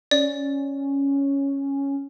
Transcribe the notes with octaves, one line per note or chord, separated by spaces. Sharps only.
C#4 D5